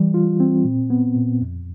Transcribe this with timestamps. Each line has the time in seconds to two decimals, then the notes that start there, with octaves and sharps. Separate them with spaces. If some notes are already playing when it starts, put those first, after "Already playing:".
Already playing: E3 G3
0.14 F4
0.40 C4
0.64 A#2
0.90 B3
1.16 A#2
1.41 F2